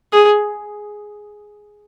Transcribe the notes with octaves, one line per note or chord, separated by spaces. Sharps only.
G#4